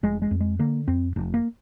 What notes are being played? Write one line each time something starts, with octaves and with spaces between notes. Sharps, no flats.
F1 G#3
G#3
F2
G#3
D3 A#3
F2 C4
F1
A#3